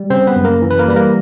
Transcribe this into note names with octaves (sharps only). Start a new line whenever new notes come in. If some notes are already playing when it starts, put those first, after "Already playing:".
Already playing: G3
C#3 C4 C5
B3 B4
F#2
A#3 A#4
E3
B4
A#3 A#4
G3 B4
A#3 A#4